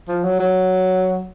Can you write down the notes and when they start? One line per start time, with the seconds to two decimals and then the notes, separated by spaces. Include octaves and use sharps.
0.08 F3
0.23 F#3
0.40 F#3